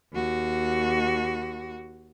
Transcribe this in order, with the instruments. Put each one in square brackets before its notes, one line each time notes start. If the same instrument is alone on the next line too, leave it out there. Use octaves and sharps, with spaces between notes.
[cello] D#2 F#4